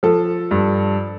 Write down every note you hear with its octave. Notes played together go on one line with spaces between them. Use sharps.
F3 A4
G2